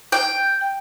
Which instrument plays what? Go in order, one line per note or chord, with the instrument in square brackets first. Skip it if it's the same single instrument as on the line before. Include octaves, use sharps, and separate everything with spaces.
[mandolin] G5